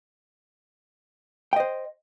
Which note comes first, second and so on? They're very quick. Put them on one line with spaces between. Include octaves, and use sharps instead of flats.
G5 D#5 C5